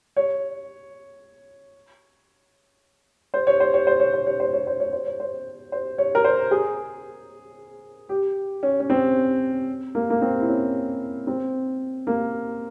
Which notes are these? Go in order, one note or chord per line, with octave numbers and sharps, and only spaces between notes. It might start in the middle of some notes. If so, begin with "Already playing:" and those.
C#5
C5
C#5
C5
C#5
C5
C#5
C5
C#5
C5
C#5
C5
C#5
C5
C#5
C5
C5
C#5
A#4
C5
G#4
G4
C#4
C#4
C4
A#3
A#3
C4
E4
C#4
C4
A#3